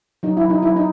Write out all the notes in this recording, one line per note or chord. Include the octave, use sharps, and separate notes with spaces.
F#3 D#4
E4
F#3
D#4
F#3 E4
D#4